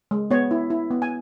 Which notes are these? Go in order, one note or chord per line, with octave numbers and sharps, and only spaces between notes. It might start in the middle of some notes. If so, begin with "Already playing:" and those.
G#3
B3 C#5
E4
E4
B3
G#5